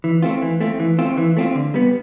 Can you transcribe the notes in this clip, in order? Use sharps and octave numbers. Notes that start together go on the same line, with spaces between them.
E3
A3 C4 F4
E3
A3 C4 F4
E3
A3 C4 F4
E3
A3 C4 F4
D3
G3 B3